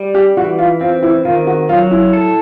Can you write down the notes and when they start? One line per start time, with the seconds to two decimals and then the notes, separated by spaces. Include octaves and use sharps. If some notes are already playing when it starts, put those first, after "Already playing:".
Already playing: G3
0.15 G4
0.37 E3 F#4
0.58 F4
0.81 C4 F4
1.03 E4
1.25 D#3 F4
1.47 F#4
1.69 F#3 F4
1.91 E4
2.13 A4